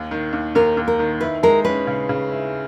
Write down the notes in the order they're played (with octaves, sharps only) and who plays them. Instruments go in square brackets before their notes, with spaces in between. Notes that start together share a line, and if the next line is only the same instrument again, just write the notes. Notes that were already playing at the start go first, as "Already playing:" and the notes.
Already playing: [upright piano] D#2
D#3
D#2
[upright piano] D#2 [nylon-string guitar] A#4
[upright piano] D#2
[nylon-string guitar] A#4
[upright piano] D#3
[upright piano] E4 [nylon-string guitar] B4
[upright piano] G#3 [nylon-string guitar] A#4
[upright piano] C#4 [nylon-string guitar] B4
[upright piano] C#3
C#3
E4